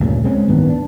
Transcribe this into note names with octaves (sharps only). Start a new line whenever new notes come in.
D2 G2 A#2 C#3
G#3 C4 C#4
D1 G2 D#3 B3
D4